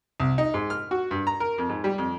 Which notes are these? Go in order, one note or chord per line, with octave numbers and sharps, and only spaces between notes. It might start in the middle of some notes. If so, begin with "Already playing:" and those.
C2
D#4
G#2
F6
F#4
G2
A#5
A#4
F2
G#2
G3
F2